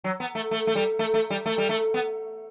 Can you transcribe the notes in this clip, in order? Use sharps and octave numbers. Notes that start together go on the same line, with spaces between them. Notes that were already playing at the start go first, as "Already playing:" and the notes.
F#3
B3
A3
A3
A3
G3
A3
A3
G3
A3
G3
A3
B3